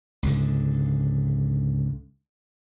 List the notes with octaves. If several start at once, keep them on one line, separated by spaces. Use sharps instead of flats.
C#2 G#2 D3